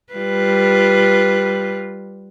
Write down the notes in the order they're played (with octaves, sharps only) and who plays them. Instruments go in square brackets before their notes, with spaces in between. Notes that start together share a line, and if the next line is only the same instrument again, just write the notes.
[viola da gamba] G3 F4 B4